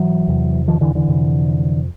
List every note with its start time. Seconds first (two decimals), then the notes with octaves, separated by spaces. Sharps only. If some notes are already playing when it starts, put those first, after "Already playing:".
Already playing: G#2 E3 F#3
0.28 E2 C3
0.68 D#3 F3
0.81 D3 E3
0.95 D3 E3
1.08 F2 C3